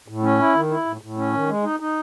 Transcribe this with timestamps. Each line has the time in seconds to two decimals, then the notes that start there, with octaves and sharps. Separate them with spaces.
0.08 A2
0.23 C#4
0.39 E4
0.54 D#3
0.70 E4
0.86 A2
1.01 A2
1.17 C#4
1.33 D#3
1.48 G#3
1.64 D#4
1.80 D#4